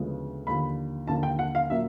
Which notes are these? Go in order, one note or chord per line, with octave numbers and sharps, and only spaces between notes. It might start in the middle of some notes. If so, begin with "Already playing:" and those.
Already playing: D2 C#3 F3 G#3 B3
D#2 D3 F3 B5
D#2 D3 F3 A#3 A5
G5
F#5
F5
A#2 F#3 A#3 E5